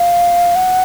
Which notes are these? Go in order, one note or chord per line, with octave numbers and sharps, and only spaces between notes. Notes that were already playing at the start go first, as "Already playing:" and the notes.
Already playing: F5
F#5